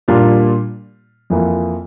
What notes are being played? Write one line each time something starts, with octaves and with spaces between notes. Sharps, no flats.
A#2 G3 A#3 D4 F4
F2 E3 A#3 F4